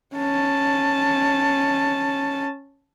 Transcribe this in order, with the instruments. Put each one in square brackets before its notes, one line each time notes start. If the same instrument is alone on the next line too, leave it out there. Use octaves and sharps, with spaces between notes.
[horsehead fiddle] C#4 A5